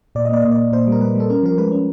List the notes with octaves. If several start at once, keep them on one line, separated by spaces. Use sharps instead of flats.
A#2 D5
D#5
A#3 D5
A#2 D#5
D5
A#2
A#2 C5
G3
A#4
G3 B4
G3 A4
C#4 A#4
F3 A#4
G#3 B4
C#4